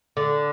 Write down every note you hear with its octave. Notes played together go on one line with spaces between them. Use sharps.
D3